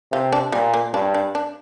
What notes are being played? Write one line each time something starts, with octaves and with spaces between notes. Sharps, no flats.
C3 F4
D4
A#2 G3
A#3
G2 D4
D4
D4